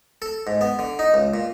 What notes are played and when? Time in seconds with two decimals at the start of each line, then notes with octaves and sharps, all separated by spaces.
0.22 A4
0.47 G#2
0.61 B3
0.79 D3
0.99 D#4
1.14 C#2
1.34 A#2